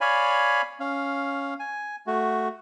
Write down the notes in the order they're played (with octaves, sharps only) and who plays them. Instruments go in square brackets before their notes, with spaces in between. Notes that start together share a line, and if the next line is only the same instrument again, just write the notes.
[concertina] C#5 D5 F5 G#5 B5
C#4 F5
G#5
A3 F#4